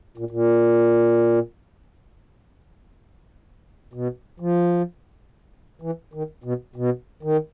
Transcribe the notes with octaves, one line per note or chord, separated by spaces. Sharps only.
A#2
A#2
B2
F3
E3
D#3
B2
B2
D#3